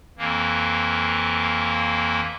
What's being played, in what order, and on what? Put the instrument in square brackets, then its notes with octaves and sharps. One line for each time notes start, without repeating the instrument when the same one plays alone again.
[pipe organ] F2 E3 A#3